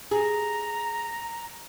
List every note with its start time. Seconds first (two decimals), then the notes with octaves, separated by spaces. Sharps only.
0.11 G#4 A#5